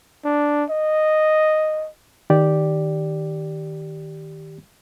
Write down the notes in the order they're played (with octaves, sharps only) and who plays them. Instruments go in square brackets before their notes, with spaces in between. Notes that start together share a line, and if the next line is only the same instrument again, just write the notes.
[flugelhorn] D4
D#5
[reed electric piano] D#3 G4 D5